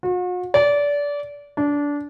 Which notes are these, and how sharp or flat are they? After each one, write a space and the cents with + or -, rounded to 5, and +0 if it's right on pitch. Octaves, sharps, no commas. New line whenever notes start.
F#4 -45
D5 -25
D4 -20